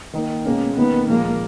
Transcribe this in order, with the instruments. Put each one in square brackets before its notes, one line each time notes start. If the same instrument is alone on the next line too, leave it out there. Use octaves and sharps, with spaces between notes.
[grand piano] D#3 A#3 D#4
[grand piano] B2 G#3 C#4 [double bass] A#3
[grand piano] D#3 A#3 D#4 [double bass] B3
[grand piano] A#2 F3 G#3 [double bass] A#3